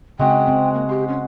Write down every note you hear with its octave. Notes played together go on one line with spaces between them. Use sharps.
C#3 G#3 C4 F#4 F#5 G5
C4
A#3
G4 C6
C#4